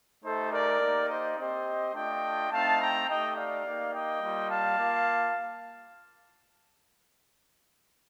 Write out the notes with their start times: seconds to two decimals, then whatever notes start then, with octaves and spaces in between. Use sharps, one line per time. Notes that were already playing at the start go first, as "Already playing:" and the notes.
0.24 A3 D#4 G4 A4 C5
0.52 A#4 D5
0.81 A#3 D#4 G4
1.09 C5 D#5
1.37 C4 G4 C5 D#5
1.94 A3 D4 F4 D#5 G5
2.51 A3 C4 D#4 F5 A5
2.79 G5 A#5
3.07 A3 D#4 G4 D#5 G5
3.36 D5 F5
3.65 A#3 D#4 G4
3.93 D#5 G5
4.22 G3 A#3 F4
4.50 F5 A5
4.78 A#3 F4